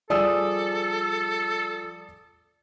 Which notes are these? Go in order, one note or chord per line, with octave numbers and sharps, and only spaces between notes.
F3 G3 G#4 A4 D5 D#6 E6